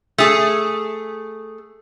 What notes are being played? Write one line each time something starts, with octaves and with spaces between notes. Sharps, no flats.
A3 G#4